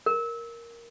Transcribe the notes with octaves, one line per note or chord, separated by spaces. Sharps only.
A#4